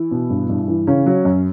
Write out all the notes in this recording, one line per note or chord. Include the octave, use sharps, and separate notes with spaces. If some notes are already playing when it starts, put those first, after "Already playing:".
Already playing: E3 E4
B2
G2
G2
E3
C#3 C#4
F#3
F#2